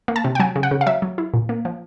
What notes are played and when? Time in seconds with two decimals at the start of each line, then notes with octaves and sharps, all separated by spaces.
0.08 A#3
0.16 A5
0.24 C3
0.35 G5
0.40 F#3 G#5
0.56 C#3
0.63 F#5
0.71 C#3
0.81 F5
0.86 F#3 E5
1.02 F#3
1.18 E4
1.34 A#2
1.49 A#3
1.65 F3